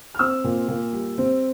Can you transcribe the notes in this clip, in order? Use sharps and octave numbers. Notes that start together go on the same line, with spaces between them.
F6
C4 E6
A#2
A#2
G3
C4